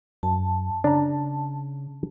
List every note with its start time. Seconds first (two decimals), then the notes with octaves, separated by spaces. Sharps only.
0.23 F#2 A5
0.84 C#3 D4 A#5